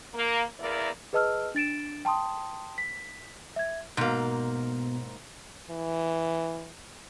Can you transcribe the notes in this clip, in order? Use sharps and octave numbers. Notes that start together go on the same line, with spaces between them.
A#3
E2 A#3 E4 A#4 D5
G#4 B4 D#5 A5 E6 F6
D4 A6 D7 E7
G5 A5 C6 D#6
B6
E5 G#6
G#2 B2 A#3
E3